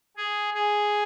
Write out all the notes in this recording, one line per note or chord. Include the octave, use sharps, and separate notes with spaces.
G#4
G#4